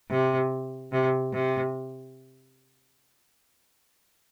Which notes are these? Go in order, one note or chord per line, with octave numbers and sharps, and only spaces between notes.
C3
C3
C3